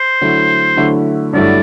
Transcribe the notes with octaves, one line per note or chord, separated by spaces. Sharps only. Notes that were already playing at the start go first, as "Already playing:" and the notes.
Already playing: C5
D3 F#3 A3 E4
D3 F#3 A3 E4
G2 D3 F#3 A3 E4 D5